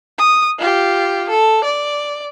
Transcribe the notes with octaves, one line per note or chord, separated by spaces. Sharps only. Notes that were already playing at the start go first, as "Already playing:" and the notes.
D#6
F4 G4
A4
D5